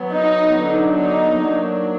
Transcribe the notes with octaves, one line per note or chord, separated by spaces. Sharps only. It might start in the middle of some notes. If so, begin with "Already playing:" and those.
Already playing: F#3 B3
D#4
D3 F#3 B3 D4
D#4
F#3 A#3 D4